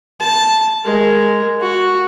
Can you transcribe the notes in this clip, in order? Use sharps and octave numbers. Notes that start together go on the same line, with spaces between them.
A5
G#3 A#4
F#4